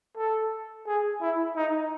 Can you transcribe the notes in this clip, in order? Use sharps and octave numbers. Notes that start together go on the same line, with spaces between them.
A4
G#4
E4
D#4